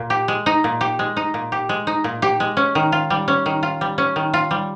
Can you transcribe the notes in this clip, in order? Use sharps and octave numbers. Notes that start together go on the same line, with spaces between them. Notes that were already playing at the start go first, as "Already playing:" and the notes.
Already playing: A#2
G4
G#3
D#4
A#2
G4
G#3
D#4
A#2
G4
G#3
D#4
A#2
G4
G#3
C#4
D#3
F4
G3
C#4
D#3
F4
G3
C#4
D#3
F4
G3